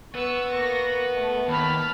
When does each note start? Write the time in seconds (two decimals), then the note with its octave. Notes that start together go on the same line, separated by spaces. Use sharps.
0.15 B3 C#6 E6
0.51 A#3 C#6 A#6
1.16 A3
1.48 D#2 A5 B5 F6